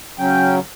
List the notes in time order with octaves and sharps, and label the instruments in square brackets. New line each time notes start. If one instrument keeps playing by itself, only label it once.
[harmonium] C#3 F#3 C#4 G5